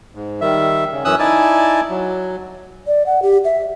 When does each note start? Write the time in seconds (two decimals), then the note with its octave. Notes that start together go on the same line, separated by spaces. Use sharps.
0.15 G#2
0.41 D#3 G3 E5
0.92 C#3
1.05 F#2 E3 C#4 D#6 E6 F#6
1.19 D#4 E4 D5 G#5 A5
1.90 F#3
2.87 D5
3.06 F#5
3.22 G4
3.45 E5